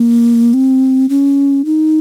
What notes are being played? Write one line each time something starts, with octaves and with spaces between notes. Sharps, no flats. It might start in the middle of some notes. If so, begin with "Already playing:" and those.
Already playing: A#3
C4
C#4
D#4